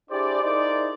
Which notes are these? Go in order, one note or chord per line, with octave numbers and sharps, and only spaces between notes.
D4 E4 G4 G#4 C5 D5
D#4 E4 G#4 A#4 C5 D5